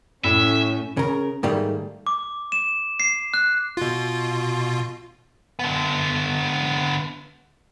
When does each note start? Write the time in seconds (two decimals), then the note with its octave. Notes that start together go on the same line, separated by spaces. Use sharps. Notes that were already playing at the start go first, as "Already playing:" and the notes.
0.24 A2 A3 C#4 E5
0.97 C#3 A#4
1.43 G#2 D#3 G3 A3 A#3
2.07 D6
2.52 E7
3.00 C7
3.34 F#6
3.77 B2 F4
5.59 D3 B3